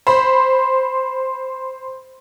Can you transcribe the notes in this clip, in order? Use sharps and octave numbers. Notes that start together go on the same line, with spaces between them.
C5 B5